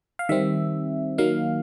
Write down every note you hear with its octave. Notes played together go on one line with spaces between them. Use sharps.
F5
D#3 G3 C4 E5
D#3 F#3 A#3 D#4 F5